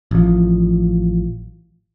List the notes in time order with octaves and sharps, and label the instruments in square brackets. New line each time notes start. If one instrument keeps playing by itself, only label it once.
[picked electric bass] A1 F3